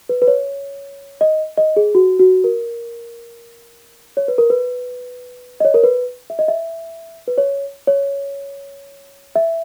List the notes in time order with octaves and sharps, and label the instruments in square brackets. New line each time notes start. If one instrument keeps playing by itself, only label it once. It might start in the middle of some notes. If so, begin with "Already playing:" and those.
[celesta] B4
B4
C#5
D#5
D#5
G#4
F#4
F#4
A#4
C#5
B4
A#4
B4
D#5
C#5
A#4
B4
E5
D#5
E5
B4
C#5
C#5
E5